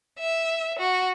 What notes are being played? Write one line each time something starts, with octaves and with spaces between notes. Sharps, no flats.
E5
F#4